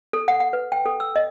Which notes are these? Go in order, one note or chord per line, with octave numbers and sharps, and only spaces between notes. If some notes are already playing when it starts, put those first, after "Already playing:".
A4
F#5
F#5
B4
G5
A4
E6
D#5